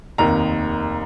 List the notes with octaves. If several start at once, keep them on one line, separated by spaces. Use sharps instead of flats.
F1 D#2 D#3 A#5